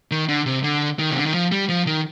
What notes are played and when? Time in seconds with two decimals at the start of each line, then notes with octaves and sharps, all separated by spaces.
0.11 D#3
0.29 D3
0.46 C3
0.63 D3
0.99 D#3
1.11 C3
1.18 D3
1.26 D#3
1.34 F3
1.52 G3
1.69 F3
1.87 D#3